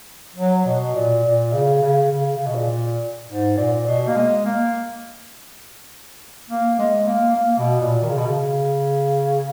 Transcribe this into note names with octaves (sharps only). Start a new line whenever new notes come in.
F#3
B2
A#2
A#2
C#3
C#3
C#3
C#3
B2
A#2
G#2
A#2
B2
A#3
G#3
A#3
A#3
G#3
A#3
A#3
B2
A#2
D#3
C#3
B2
C#3